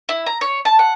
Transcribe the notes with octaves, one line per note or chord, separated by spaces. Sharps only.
E4
A#5
C#5
A5
F#5